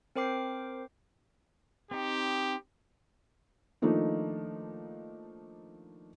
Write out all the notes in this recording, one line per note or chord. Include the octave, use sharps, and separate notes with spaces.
C4 A#4 C5 G5 D6 C7
C4 D#4 G4
D#3 F3 A3 A#3 D4 D#4